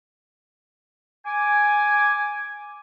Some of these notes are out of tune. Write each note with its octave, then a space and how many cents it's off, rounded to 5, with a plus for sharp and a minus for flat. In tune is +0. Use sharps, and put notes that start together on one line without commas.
G#5 +0 D6 +0